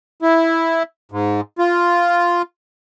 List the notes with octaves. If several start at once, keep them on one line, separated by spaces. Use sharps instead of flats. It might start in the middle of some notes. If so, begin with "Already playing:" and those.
E4
G#2
F4